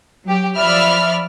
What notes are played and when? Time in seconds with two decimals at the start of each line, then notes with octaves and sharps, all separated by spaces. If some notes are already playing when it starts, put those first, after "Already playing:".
0.24 F#3 G4
0.57 F3 D5 E5 B5 F6